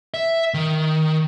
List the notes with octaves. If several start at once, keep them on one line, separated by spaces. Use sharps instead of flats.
E5
D#3